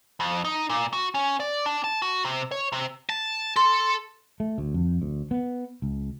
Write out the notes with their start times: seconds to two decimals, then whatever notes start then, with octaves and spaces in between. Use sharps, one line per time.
0.20 F2
0.45 D#4
0.70 A#2
0.93 F#4
1.15 C#4
1.40 D5
1.66 D4
1.84 A5
2.02 F#4
2.25 C3
2.51 C#5
2.72 C3
3.09 A5
3.56 A4 C6
4.40 A3
4.58 D2
4.74 F2
5.02 D2
5.31 B3
5.82 C#2